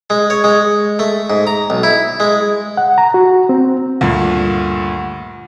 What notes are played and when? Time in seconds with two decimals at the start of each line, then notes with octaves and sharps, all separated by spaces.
0.10 G#3
0.30 C#5
0.44 G#3
0.99 A3
1.30 G#2
1.47 A#5
1.70 B1
1.83 E4
2.20 G#3
2.77 F#5
2.98 A#5
3.14 F#4
3.49 C4
4.01 D2 G2 A#2